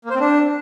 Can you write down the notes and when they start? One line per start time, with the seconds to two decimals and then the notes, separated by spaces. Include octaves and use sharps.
0.05 A#3
0.10 C5
0.15 C4
0.20 D4